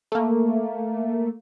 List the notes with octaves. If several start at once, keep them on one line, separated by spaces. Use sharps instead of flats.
A3 A#3